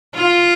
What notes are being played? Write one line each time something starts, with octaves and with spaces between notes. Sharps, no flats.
F4